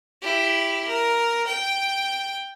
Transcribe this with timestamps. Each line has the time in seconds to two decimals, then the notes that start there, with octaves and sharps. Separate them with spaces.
0.22 E4 G4
0.87 A#4
1.47 G5